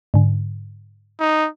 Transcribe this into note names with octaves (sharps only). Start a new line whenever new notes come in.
G#2 D3
D#4